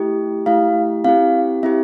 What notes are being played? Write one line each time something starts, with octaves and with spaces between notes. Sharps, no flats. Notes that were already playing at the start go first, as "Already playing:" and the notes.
Already playing: A3 E4 G4
A3 E4 G4 F5
C4 E4 G4 F5
C4 E4 G4 E5